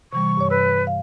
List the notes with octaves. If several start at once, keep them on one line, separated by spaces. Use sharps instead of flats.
C3 E3 G3 C#6
G2 C#5
B4 E6
F5